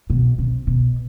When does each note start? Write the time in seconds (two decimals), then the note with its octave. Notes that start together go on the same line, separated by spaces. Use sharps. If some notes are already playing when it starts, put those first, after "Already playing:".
0.10 B2
0.38 C3
0.67 B2